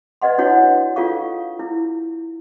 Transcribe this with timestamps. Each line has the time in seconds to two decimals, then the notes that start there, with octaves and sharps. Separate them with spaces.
0.22 B4 D5 D#5 F#5 C6
0.38 D4 E4 F#4 C#5 F#5
0.96 F4 A4 F5 C#6
1.59 E4